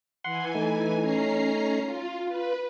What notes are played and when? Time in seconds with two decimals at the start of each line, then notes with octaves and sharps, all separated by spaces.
0.24 E3 F#5 G#5 C6
0.55 A3 D#4
1.00 C#4 A#5 C7
1.84 F4
2.27 F4 B4